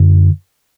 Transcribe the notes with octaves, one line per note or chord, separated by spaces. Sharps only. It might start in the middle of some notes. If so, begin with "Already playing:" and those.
Already playing: F#2 D3